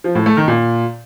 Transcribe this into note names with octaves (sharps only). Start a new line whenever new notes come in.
F3
A2
A3
D#3
A#2